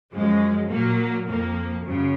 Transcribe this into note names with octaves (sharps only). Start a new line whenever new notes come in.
F#2 F3 G#3
A#2 F#3 A#3
F2 F3 A#3
F#2 C#3